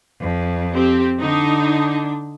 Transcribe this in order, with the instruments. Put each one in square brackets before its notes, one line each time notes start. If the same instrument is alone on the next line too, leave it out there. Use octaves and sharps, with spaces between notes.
[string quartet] F2
[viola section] C4 G4
[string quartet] D3 D4 [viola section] D#4